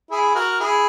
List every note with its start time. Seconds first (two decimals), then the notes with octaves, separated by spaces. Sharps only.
0.11 E4 G#4
0.35 F#4 A#4
0.60 E4 G#4